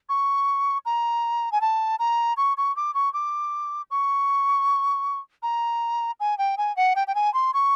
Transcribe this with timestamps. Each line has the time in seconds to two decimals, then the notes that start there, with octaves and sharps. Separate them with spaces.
0.09 C#6
0.85 A#5
1.52 G#5
1.61 A5
1.99 A#5
2.37 C#6
2.57 C#6
2.76 D6
2.94 C#6
3.13 D6
3.90 C#6
5.42 A#5
6.20 G#5
6.38 G5
6.57 G#5
6.76 F#5
6.96 G5
7.07 G5
7.15 G#5
7.34 C6
7.54 C#6